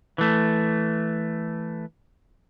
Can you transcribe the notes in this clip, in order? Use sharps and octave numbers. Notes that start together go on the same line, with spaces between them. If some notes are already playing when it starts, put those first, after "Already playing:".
E3 A3